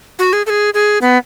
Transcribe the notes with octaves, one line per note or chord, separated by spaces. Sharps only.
F#4
G#4
A4
G#4
G#4
B3